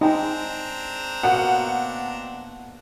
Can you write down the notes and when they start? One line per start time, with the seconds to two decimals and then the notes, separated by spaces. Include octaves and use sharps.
0.01 G#3 C4 D4 D#4 G5 A#5
1.23 B2 A#3 B3 F#5